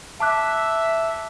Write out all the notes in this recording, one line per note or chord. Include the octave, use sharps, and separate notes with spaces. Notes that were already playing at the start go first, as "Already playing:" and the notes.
E5 A5 D6 F#6